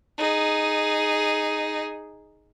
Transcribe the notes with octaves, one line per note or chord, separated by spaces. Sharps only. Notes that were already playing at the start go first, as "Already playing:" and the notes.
D#4 G#4